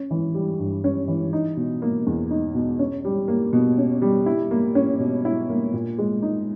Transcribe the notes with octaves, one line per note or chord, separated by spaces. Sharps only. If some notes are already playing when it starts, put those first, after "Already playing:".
Already playing: C#4
E3
G3
G2
C#4
E3
D#4
B2
A#3
E2
D#4
B2
C#4
G3
A#3
B2
C#4
G3
E4
A#3
C#4
B2
E4
A#3
A#2
G#3
D#4